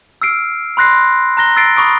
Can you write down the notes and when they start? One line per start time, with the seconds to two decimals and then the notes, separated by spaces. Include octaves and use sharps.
0.22 E6 F6 C7 D7
0.77 B5 C6 F#6 A#6 C7
1.37 A#5 F#6 A#6 G7
1.56 E6 A6 A#6 C7 D7
1.76 B5 C#6 D#6 D7